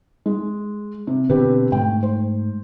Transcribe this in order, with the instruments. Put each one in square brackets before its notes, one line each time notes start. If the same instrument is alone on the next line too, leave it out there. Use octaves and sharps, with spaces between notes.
[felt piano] G#3
C3
[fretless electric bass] B2 D3 [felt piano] C4 G4 B4
[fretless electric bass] G#2 A3 [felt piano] G5
[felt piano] C5